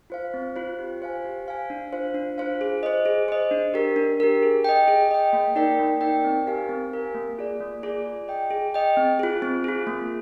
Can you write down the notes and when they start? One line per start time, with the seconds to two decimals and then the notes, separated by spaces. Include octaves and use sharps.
0.10 F4 C5 F5
0.34 C4
0.56 F4 C5 F5
0.79 G4
1.02 C5 F5 G#5
1.25 G4
1.47 C5 F5 G#5
1.70 D4
1.93 F4 C5 F5
2.14 D4
2.38 F4 C5 F5
2.61 G#4
2.83 C5 D#5
3.05 G#4
3.28 C5 D#5
3.51 D4
3.74 G4 A#4
3.96 D4
4.20 G4 A#4
4.43 G#4
4.64 D#5 G5
4.88 G#4
5.11 D#5 G5
5.33 A#3
5.56 D#4 A#4 D5 G5
5.79 A#3
6.01 D#4 A#4 D5 G5
6.24 C4
6.47 G4 A#4 F5 G#5
6.69 C4
6.92 G4 A#4 F5 G#5
7.15 A#3
7.38 F4 G#4 D5
7.61 A#3
7.83 F4 G#4 D5
8.06 G#4
8.28 D#5 G5
8.51 G#4
8.74 D#5 G5
8.97 C4
9.19 F4 G#4
9.42 C4
9.64 F4 G#4
9.87 A#3